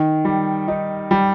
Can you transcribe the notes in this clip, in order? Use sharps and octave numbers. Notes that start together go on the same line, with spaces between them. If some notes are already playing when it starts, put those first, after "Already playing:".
Already playing: D#3
G3
D#4
G3